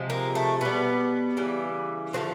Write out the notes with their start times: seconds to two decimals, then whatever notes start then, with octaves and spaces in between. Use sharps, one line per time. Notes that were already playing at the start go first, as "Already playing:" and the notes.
Already playing: C3 F3 G#3
0.10 A#3
0.35 A3
0.61 B2 G3 B3
1.37 C#3 E3 G3
2.13 D3 F3 A3 C4